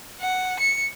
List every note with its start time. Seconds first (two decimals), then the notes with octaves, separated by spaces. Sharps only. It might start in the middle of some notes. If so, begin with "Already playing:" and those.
0.21 F#5
0.60 C#7